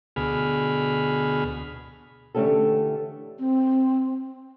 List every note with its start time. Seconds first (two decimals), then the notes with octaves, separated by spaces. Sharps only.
0.16 D2 B2 G#4 B5 F6
2.35 D3 E3 A3 C#4 G4 A4
3.39 C4